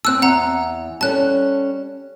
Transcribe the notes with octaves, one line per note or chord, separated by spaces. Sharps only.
C4 A5 E6 F#6
E2 F#5 A#5
G3 C#4 A4 A5 F#6